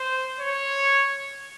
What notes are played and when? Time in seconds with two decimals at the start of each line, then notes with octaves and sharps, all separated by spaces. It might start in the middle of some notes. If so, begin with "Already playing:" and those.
Already playing: C5
0.39 C#5